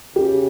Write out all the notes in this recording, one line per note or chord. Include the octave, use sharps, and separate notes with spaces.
C#3 G4